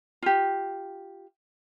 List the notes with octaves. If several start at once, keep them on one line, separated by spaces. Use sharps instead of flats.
F4 G4